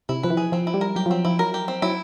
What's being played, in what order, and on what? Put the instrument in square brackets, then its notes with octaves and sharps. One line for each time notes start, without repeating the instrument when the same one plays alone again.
[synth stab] C3 [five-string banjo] E4
[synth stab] F3 [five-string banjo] B4
[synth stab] E3
[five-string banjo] G#4
[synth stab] F3 [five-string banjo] C4
[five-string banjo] E4
[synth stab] G3
[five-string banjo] A#4
[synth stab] F#3 [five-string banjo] G4
[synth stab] F3
[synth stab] F#3 [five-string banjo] C4
[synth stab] F3 [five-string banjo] E4
[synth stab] F#3 [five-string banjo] A#4
[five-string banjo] G4
C4
[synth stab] F#3 [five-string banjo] E4